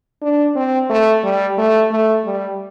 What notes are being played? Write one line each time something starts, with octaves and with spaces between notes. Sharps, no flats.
D4
C4
A3
G3
A3
A3
G3